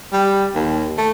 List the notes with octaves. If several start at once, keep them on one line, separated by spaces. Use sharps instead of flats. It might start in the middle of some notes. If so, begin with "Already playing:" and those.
G3
D#2
A3